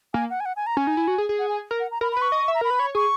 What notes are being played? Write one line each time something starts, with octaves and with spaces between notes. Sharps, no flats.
A#3 G#5
F#5
G#5
F#5
G#5
A#5
C#4 G#5
D#4
E4
F#4
G#4
G#4
F#5
G#5
A#4
F#5
A#5
A#4 B5
B5
B4
C#6
D#5
E5
A#5
A#4 B5
B4
C#5
G#4 C#6